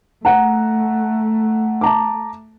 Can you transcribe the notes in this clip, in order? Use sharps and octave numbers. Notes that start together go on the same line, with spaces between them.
A3 F#5 A#5
A5 A#5 D6